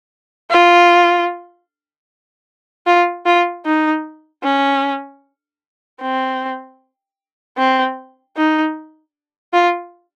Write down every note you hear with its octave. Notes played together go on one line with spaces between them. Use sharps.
F4
F4
F4
D#4
C#4
C4
C4
D#4
F4